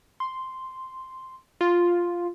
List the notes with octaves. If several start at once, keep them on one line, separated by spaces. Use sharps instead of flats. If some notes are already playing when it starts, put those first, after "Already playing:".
C6
F4